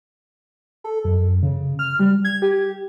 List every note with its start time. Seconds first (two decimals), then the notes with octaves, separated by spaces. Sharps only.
0.84 A4
1.04 F#2
1.43 C#3
1.79 F6
1.99 G3
2.25 G#6
2.42 G4